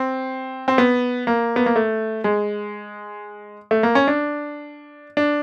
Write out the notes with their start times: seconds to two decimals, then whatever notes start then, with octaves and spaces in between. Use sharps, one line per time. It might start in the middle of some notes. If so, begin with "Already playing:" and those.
Already playing: C4
0.68 C4
0.78 B3
1.27 A#3
1.56 B3
1.66 A#3
1.76 A3
2.24 G#3
3.71 A3
3.83 A#3
3.95 C#4
4.07 D4
5.17 D4